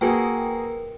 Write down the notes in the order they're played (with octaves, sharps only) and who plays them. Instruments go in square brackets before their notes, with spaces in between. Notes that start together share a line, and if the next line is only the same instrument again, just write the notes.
[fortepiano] A#3 F#4 G#4 [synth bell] A#4 B4 G5